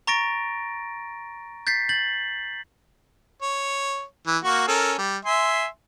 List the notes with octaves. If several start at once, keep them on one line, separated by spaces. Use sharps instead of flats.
A#5 C#6 A6 A#6 D7
G6 A6 B6 C7
G6 A6 F#7
C#5
E3
A#3 F#4 C#6
C#4 A4 A#4
G3
E5 G#5 C6